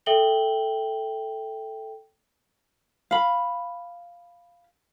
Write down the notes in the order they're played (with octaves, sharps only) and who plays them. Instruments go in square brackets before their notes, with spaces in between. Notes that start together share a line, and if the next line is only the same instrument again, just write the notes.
[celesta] A4 E5 G5 F#7 G7
[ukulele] F5 B5